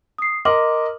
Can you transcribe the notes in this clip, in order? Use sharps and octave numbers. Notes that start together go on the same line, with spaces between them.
D#6 C7
A#4 D#5 C6 D6 F#7